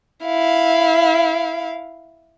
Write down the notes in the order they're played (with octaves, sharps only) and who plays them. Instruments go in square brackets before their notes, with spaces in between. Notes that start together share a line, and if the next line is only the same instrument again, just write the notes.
[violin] E4 F5